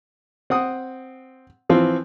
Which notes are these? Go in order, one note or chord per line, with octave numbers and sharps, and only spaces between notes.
C4 F#5 D#6
E3 F3 C4 F4